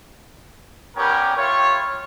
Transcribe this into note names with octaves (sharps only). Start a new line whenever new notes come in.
G3 B3 C#4 G4 A#4 G5
E4 F4 G4 C#5